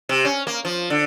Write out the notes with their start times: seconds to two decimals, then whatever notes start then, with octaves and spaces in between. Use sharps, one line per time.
0.09 C3
0.25 C#4
0.47 A#3
0.65 F3
0.90 D3